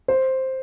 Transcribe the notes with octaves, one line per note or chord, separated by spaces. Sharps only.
C5